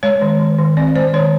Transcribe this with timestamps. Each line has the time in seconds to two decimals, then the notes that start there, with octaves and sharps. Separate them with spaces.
0.03 G#3 C#5
0.21 D#3
0.40 D#3
0.58 D#3
0.77 C4 D5
0.95 G#3 C5
1.13 D#3 C#5